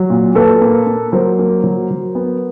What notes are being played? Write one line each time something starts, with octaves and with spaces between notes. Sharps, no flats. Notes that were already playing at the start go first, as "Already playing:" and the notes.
Already playing: F#3
A#2
A#2 A4 B4
A#3
A#3
F#3 A#4 C5
A#3
F#3
F#3
B3